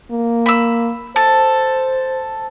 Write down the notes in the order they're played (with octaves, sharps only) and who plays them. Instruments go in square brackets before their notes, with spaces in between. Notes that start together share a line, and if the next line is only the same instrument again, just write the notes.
[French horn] A#3
[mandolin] B5 E6
[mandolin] A4 [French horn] C5